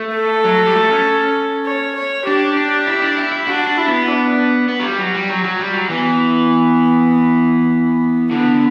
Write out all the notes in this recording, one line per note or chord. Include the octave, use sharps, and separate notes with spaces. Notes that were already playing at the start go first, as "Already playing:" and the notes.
Already playing: A3
A4
F#3
G3
A3
C#4
C#5
C#5
D4 G4
D4
E4
D4
E4
E4
D4 F#4
D4
E4
B3
D4
B3
F#3
G3
F#3
G3
F#3
F#3
G3
F#3
E3 B3
D3 B3